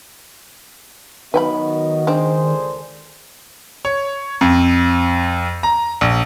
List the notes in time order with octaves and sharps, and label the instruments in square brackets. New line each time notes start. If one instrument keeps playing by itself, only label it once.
[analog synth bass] D#3 [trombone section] F#3 B3 F#4 [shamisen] B4 G5 B5 [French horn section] D#5
[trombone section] C#2 G#4 C5 [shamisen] C4 D4
[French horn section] A4 A#4 D5
[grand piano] C#5
F2
A#5
A#1